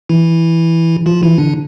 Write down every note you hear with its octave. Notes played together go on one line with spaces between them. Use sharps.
E3 E4
F3 F4
E3 E4
D3 D4